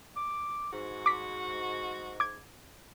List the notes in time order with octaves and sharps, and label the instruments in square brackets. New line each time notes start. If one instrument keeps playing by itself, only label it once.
[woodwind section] D6
[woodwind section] G#2 [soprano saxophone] F#4
[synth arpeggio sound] D6 B6
D6 G#6